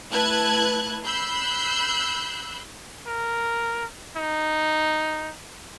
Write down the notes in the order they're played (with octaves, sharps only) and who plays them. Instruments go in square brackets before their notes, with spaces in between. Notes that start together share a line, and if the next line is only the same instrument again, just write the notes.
[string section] A3 E4 B4 A5 F#6 G#6
B5 E6 F#6 G6 C7
[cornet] A#4
D#4